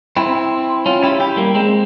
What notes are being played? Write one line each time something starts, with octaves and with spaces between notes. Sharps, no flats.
C4 E4
C#4 F4
E4 G4
E4 G4
G3 A#3
G#3 C4